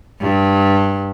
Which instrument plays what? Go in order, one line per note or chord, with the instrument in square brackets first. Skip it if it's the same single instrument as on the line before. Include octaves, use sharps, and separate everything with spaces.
[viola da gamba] G2